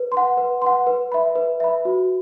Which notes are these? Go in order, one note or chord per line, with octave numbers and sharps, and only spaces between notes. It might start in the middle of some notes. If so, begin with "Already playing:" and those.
Already playing: B4
C6
F#5
B4
F#5 C6
B4
E5 B5
B4
E5 B5
F#4